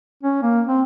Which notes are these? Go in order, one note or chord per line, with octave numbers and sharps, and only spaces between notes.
C#4
A#3
C4